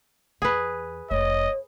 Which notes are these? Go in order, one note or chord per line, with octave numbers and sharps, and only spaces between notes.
E2 G#4 B4
F1 A3 C#5 D#5